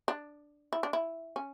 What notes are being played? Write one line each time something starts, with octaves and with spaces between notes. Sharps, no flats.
D4
E4
D4
E4
C#4